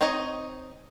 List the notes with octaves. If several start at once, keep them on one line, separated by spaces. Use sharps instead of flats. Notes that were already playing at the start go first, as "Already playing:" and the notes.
C4 D#4 C#5 D#5